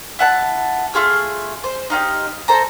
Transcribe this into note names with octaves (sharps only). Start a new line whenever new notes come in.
E4 F#5 A5
A3 F4 G#4 E6
C5
D#4 F4 G4 D#5
A4 C5 A#5